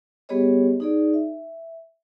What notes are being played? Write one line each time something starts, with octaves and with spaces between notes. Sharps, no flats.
G3 B3 G4 G#4 C#5 D#5
D#4 G#4 D5
E5